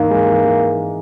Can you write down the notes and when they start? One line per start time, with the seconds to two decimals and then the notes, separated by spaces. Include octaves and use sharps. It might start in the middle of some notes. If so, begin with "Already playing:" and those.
Already playing: G#2 E3 A#3 D#4
0.10 G#3
0.27 E3
0.44 E3